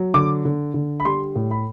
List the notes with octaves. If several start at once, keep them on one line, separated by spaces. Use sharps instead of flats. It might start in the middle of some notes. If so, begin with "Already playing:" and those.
Already playing: F#3
D3 D6
D3
D3
B5
G3 C6
A2
B5